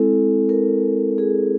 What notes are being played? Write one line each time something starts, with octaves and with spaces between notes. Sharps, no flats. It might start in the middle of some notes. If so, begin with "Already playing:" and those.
Already playing: G#3 C4 E4 A4
A#4
G#4